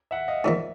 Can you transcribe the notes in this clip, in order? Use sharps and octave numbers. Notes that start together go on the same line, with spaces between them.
E5 F#5
D#5 F5
G#2 F3 A#3 D5 E5